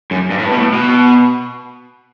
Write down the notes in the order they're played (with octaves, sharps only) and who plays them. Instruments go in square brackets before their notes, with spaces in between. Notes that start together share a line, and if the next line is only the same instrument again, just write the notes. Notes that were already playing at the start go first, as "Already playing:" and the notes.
[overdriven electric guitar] F#2
G2
A2
G2
B2
A2
B2